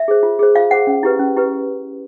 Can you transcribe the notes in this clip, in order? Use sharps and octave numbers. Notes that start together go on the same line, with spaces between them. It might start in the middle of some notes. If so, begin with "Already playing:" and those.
Already playing: E5
G#4 C5
F4
G#4 C5
F4 F5
G#4 C5 F#5
C#4
E4 G4 B4
C#4
E4 G4 B4